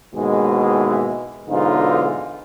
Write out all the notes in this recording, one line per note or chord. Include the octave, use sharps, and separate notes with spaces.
D#2 G#2 B2 E3 G#3
B1 G#2 D3 E3 D#4 F4